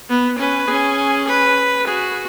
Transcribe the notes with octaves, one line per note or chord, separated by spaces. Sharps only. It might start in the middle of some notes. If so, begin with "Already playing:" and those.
B3
C#4 B4
C#4 G#4
B4
F#4 G#4